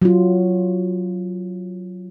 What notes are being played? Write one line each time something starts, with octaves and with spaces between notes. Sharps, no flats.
F#3 F4